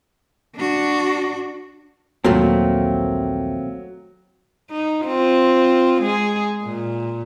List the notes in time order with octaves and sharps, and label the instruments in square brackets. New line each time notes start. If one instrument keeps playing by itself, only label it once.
[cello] D4 F#4
[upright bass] A#1 D#2 [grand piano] F#3 [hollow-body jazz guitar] A3 A#3 C4
[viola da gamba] D#4
C4 F4
G#3 G#4
A#2